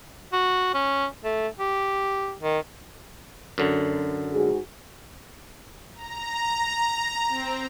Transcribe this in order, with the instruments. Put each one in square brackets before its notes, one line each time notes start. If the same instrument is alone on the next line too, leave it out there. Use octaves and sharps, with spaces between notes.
[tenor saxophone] F#4
C#4
A3
G4
D#3
[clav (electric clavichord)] F#2 D3
[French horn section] G#2 F#4 G#4
[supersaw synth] A#5
C4